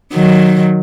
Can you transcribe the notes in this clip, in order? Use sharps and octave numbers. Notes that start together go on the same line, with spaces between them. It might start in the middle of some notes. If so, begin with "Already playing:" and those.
D#3 F#3